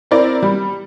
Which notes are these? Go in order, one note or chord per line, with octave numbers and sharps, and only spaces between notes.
C4 E4 A#4 D5
G3